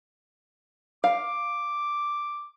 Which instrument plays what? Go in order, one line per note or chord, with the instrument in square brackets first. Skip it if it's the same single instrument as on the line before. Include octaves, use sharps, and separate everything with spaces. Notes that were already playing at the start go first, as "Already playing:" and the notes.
[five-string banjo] F5 [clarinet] D6